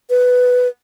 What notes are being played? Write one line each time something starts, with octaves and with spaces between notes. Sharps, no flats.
B4